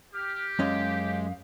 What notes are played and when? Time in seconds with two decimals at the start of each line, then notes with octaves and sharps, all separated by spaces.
0.14 G4 F6
0.59 F#2 G#3 C#4 D#5 F5